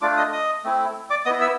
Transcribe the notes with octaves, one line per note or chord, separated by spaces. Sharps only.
A3 D4 F4 D5 D6
D#5 D#6
D#5 D#6
A3 C4 E4
D5 D6
B3 E4 D#5 D#6
E5 E6